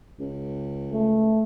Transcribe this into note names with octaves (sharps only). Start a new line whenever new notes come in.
C#2
A3